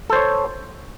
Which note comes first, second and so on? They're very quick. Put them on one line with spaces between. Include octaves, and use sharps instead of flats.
A4 C5 C#5